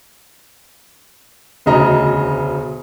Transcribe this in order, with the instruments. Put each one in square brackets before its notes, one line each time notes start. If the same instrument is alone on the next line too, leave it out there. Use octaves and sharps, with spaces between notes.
[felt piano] E1 D2 C#3 D#5 A#5